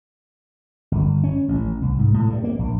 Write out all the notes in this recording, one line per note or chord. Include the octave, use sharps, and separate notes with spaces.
G1
C#4
A1
C2
G#2
A2
G2
A#3
A#1